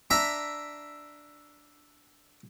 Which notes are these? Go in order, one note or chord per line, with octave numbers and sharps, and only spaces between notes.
D4 E5 A#5 B5